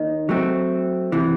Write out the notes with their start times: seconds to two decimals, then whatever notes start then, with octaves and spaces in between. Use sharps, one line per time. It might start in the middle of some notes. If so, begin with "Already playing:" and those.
Already playing: D#2 D#3 D#4
0.29 F#3 A3 C4
1.12 C3 E3